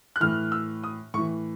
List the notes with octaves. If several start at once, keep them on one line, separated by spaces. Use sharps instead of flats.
F#6
A2 E3 F6
E6
D#6
A2 E3 C#6